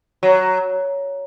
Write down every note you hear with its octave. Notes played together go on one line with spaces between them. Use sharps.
F#3